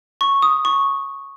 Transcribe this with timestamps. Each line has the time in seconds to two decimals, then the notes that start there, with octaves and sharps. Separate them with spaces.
0.21 C#6
0.42 D#6
0.65 C#6